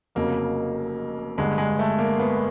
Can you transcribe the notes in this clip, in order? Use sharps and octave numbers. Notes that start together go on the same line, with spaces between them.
F1 F2 C#3 F#3 A#3
G1 G2 D3 G#3
G#3
A3
A#3
B3